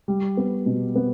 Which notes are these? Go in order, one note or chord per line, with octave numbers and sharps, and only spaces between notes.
G3
B3
B2
B3